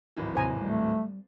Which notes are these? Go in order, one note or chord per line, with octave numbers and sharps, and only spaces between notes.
D1 G#1 E3
D#2 C3 C5 G#5 A#5
G3 A3